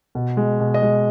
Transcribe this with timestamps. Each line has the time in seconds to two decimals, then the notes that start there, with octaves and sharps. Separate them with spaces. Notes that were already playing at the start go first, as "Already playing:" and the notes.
0.15 B2
0.37 G#3
0.60 B2
0.74 D#5
0.82 G#3